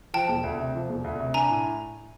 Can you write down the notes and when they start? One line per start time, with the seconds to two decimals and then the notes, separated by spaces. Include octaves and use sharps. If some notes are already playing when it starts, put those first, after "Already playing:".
0.14 F3 G5 A5
0.29 E1
0.44 D2
0.59 C3
0.75 F3
0.89 E1
1.04 D2
1.20 C3
1.34 D4 G#5 A#5
1.49 A2